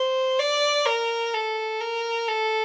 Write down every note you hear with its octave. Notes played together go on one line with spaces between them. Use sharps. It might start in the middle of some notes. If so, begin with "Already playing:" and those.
Already playing: C5
D5
A#4
A4
A#4
A4